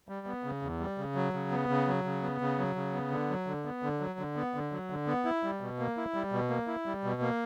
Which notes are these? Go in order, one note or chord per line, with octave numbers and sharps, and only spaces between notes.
G3
B3
C#3
E2
G3
C#3
F#3
C#3
B3
C#3
F#3
C#3
B3
C#3
F#3
C#3
B3
D3
F#3
D3
B3
D3
F#3
D3
B3
D3
F#3
D3
B3
E4
G3
B2
A#3
E4
G3
B2
A#3
E4
G3
B2
A#3